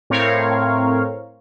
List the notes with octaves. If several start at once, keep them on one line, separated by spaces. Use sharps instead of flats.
A2 C4 A#4 C#5 F5